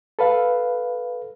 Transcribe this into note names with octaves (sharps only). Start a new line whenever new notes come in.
A4 B4 F5